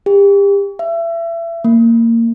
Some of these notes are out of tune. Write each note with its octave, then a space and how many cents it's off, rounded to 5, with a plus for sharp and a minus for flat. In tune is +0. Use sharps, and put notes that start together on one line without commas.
G4 +35
E5 +30
A#3 -20